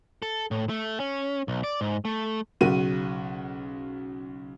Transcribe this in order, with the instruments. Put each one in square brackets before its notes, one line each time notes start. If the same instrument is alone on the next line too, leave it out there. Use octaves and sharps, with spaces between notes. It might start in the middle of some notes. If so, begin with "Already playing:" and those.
[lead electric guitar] A4
A2
A3
C#4
B1
D5
G#2
A3
[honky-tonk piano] B1 C#3 F#4 D#7